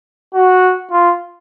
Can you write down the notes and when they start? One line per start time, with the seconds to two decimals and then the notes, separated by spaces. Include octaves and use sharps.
0.34 F#4
0.91 F4